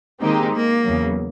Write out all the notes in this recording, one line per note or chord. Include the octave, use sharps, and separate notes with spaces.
D#3 G#3 A#3 C4 D#4 G4
A#3
E2 C#3 F#3